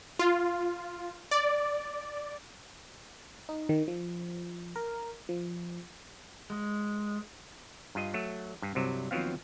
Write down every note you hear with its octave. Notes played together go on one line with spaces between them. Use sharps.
F4
D5
D#4
D#3
F3
A#4
F3
G#3
G2 F4 D#5
F#3 A3
G2
C2 G2 C3 F#3
D#2 F3 F#3 B3 C4 F5